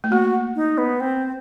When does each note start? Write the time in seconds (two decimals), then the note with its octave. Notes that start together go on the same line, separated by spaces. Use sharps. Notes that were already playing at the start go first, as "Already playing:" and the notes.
0.04 A3
0.11 A#3 F#4
0.56 D#4
0.78 B3
1.00 C4